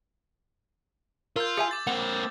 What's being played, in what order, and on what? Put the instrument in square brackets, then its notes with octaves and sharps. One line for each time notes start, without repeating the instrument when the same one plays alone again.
[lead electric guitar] F4 [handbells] A#4 [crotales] E6 G6
[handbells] G#4 E5 G#5
[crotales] D6 A6
[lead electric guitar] A#3 C4 [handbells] F#5